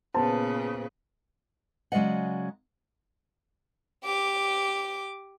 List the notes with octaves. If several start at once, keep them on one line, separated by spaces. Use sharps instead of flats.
A#2 C#3 B3 B4 C5 A5
C#3 F#3 G#3 D5 D#5 F#5
G4 D6